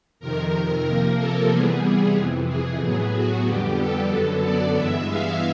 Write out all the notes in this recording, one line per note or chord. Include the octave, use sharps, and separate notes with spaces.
F2 C3 D#3 A#4
A#4
C3 F3 A#3
A4
C3 E3 G3 B3 G#4
F2 C3 E3
G#4
A2 F#3 B3
F#4
F2 D3 G3 B3 G4
A4
F#2 D3 F#3 B3
D5
G2 E3 G#3 B3 E5
F5